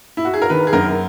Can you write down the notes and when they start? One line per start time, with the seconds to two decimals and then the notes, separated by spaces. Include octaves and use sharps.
0.17 E4
0.25 F#4
0.34 G#4
0.42 A#4
0.50 D#3 B4
0.67 G#4
0.73 F#2 A#4